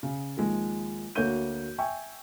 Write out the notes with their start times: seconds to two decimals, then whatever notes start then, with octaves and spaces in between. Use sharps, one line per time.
0.03 C#3
0.37 D#2 F3 G#3
1.15 D2 A#3 F#4 C#5 G6 D#7
1.78 E5 G5 G#5 C#6